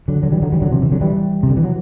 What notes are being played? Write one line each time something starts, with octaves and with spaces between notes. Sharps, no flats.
D3 F#3
D3 F#3
E3 G3
D3 F#3
E3 G3
D3 F#3
C3 E3
C3 E3
D3 F#3
E3 G3
C3
D3
E3
F#3